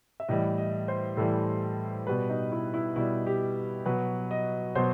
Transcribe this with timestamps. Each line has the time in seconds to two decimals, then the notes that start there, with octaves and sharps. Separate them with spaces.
0.20 E5
0.28 A2 E3 G3 D#5
0.58 D#5
0.88 C5
1.17 A2 E3 G3 A4
2.07 B2 G3 B4
2.30 D#4
2.52 E4
2.74 E4
2.96 B2 G3 E4
3.26 G4
3.86 B2 F#3 B4
4.31 D#5
4.75 B2 F#3 C5